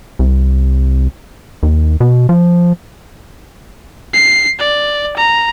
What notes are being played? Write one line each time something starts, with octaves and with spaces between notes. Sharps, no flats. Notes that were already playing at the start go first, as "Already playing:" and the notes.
C2
D#2
B2
F3
C7
D5
A#5